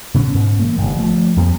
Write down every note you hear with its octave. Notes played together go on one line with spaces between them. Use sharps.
B2 D3 C#4
G#2
E3 G#3 A#3
G1 G#2 C3
F3 A3
F2 G3 B3